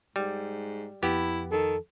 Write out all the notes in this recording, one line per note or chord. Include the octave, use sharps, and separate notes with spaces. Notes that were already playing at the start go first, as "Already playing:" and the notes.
G#2 G3
F2 B3 E4 G4
D#3 A4